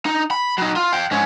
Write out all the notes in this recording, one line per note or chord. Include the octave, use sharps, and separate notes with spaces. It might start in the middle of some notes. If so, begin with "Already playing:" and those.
D#4
B5
F#3 D#4
F4
F5 G5
G#2 C#4